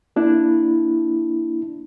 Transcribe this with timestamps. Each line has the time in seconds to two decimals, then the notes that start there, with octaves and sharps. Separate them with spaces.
0.16 A#3 D4 E4